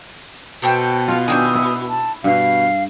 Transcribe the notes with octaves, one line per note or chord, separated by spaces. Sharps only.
B2 A4 C5 G5
F4 F5
D#3 D4 G#5 D#6 E6 G6
E4
A5
G2 B2 F5